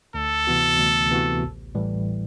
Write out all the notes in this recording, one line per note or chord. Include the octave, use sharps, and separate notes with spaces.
D2 A4
C3 E3 B3 F#4
D2
C3 E3 B3 F#4
A1
A2 E3 G3